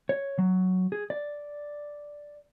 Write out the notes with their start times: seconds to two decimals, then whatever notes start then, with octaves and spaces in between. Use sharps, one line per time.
0.09 C#5
0.39 F#3
0.92 G#4
1.10 D5